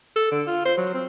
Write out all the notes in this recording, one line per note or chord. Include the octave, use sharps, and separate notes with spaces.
A4
D3
F4
C5
F#3
C4